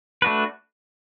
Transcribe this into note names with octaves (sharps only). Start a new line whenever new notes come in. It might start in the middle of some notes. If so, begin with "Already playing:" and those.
A3 D4 F#4 B4